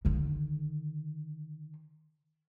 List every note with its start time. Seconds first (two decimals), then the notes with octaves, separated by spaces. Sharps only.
0.05 D3 D#3